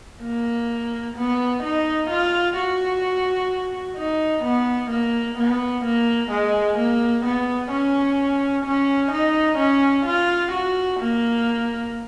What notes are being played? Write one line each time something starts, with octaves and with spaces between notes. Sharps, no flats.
A#3
B3
D#4
F4
F#4
D#4
B3
A#3
B3
A#3
G#3
A#3
B3
C#4
C#4
D#4
C#4
F4
F#4
A#3